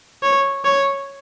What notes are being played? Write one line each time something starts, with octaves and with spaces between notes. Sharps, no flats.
C#5
C#5